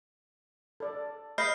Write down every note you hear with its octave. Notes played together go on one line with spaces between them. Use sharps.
A4 D5
D#5 B5 F6 G6 C7